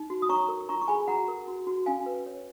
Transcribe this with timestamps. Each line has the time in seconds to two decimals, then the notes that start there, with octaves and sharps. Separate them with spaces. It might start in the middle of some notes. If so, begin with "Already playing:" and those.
Already playing: D#4
0.10 F#4
0.22 D#6
0.29 C#5 A#5 C#6
0.48 A#4
0.69 F4 A#5 C#6
0.82 C#6
0.88 G#4 G#5 B5
1.08 F#4 F#5 A#5
1.28 A#4
1.48 F#4
1.67 F#4
1.86 C#4 F5 G#5
2.06 B4
2.26 C#5